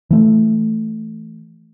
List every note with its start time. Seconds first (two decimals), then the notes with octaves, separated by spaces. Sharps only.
0.11 E3 A3